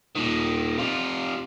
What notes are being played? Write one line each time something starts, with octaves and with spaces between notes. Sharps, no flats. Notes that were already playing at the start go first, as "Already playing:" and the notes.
A#2 D#3
C3 F4